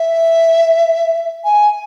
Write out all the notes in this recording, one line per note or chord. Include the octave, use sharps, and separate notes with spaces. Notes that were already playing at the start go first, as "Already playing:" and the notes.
Already playing: E5
G#5